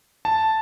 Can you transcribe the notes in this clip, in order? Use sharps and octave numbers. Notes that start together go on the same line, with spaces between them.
A5